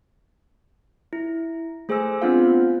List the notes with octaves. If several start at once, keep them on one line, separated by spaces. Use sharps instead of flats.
E4
A3 G#4 C5 G#5 E6
B3 C4 D4 F4 C5 F5